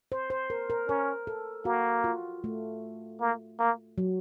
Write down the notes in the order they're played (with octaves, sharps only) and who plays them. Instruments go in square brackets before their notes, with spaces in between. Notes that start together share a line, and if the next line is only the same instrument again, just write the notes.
[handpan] C5
C5
A#4
A#4
[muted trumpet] C#4 [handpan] A#4
[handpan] A4
[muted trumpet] A#3 [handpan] F#4
[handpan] F4
A3
[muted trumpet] A#3
A#3
[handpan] F#3